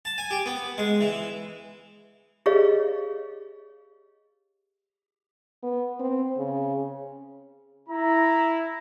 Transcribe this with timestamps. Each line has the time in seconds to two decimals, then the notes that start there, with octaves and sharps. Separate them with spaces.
0.05 A5
0.18 G#5
0.31 G4
0.46 B3
0.78 G#3
1.01 E3
2.46 G4 G#4 B4 C#5 D#5 F5
5.63 B3
6.00 C4
6.38 C#3
7.89 E4 A#5